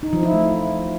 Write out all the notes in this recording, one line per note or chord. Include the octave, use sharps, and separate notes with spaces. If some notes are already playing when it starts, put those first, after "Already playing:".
D#4
F3
E4
A3